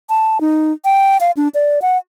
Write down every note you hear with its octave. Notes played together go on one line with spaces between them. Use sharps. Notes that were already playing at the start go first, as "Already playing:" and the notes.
A5
D#4
G5
F5
D4
D5
F#5